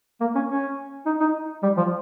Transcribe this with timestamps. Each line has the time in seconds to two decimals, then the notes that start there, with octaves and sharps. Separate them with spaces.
0.21 A#3
0.35 C#4
0.49 C#4
1.06 D#4
1.20 D#4
1.63 G3
1.77 F3